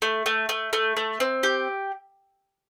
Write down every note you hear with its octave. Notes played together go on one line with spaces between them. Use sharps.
A3
A3
A3
A3
A3
C4
G4